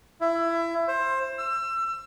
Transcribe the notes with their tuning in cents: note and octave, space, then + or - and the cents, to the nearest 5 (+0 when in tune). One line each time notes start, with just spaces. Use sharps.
E4 +20
C5 +20
E6 +30